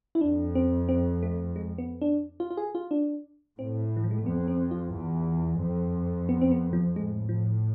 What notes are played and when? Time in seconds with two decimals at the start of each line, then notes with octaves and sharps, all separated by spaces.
0.15 E4
0.21 F2 D4
0.55 C4
0.89 C4
1.23 A3
1.56 G#3
1.78 B3
2.01 D4
2.40 F4
2.51 F4
2.57 G#4
2.75 F4
2.91 D4
3.59 A2 C4
3.97 E3
4.04 F3
4.11 G#3
4.19 A3
4.26 F2 B3
4.48 C4
4.71 F4
4.93 E2
5.60 F2
6.29 B3
6.41 C4
6.51 B3
6.73 F3
6.95 A2 G#3
7.29 F3